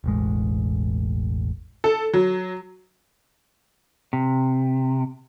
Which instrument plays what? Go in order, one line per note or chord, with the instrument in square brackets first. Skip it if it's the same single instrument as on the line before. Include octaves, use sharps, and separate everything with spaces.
[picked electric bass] E1 A1 G#3
[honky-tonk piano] A4
F#3
[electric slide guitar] C3